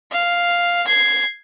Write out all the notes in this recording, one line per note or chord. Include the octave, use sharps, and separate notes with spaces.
F5
G#6 C7